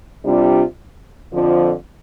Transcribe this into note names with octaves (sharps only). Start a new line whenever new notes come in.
C3 G3 D4 F4
F2 D3 F3